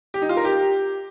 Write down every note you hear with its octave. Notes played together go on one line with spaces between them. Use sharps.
G4
D#4
F4
A#4
G4